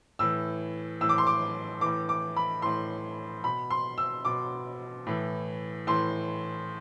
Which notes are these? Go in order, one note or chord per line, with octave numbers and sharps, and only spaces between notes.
A2 E3 E6
A2 E3 E6
D6
C6
D6
A2 E3 D6
D6
B5
A2 E3 C6
B2 B5
C6
E6
B2 D6
A2 E3
A2 E3 C6